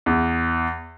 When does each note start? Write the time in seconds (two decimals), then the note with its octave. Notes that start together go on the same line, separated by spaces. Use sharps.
0.06 E2